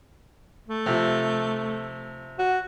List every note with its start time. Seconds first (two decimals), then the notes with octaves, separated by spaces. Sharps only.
0.68 A3
0.86 C3 F3
2.39 F#4